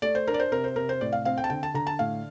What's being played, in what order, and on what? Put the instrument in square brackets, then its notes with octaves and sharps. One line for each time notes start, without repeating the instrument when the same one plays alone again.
[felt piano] A3 D5
C5
D4 A#4
D5
C5
C3 A#4
C5
C3 A#4
C5
A2 D5
F5
C4 F5
G5
A5
D3 G5
A5
D3 A#5
A5
A2 F5